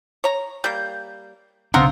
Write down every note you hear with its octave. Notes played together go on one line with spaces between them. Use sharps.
C#5 A#5
G3 A#3 G6
B1 C#3 B3 C4 D4 F5 A#5